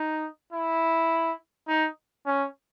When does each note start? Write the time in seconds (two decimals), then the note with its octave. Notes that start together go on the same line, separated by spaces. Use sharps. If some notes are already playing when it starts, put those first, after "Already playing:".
Already playing: D#4
0.52 E4
1.68 D#4
2.26 C#4